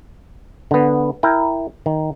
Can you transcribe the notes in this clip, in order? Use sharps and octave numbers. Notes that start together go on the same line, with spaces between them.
D3 B3
E4 A#4 G5
D#3